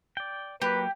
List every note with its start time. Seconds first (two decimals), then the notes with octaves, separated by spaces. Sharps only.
0.17 D5 G5
0.62 F#3 A#3 G4 B4